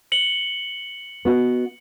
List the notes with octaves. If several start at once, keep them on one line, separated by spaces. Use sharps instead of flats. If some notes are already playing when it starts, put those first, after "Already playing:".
C#7 F#7 G7
B3 F#4 D#5